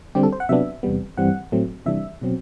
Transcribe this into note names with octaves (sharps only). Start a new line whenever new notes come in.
D3 G3 C4 G4
A4
C5
F#5
C3 F#3 B3 D4 E5
E2 C3 G3 B3
G2 E3 G3 C4 F#5
A2 F#3 A3 C4
C3 E3 G3 D4 E5
B2 F#3 C4